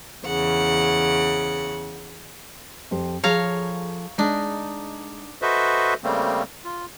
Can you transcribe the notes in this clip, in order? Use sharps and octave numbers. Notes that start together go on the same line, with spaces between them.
E2 C#3 F#5
F2 G4 C5
F3 G#4 A4 C#5 F5 A#5
G#3 D4 D#4
F#4 A4 B4 C5 D#5 E5
C#3 G3 A3 A#3 C4
F4